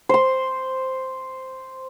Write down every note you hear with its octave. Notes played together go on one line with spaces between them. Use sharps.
C5 C6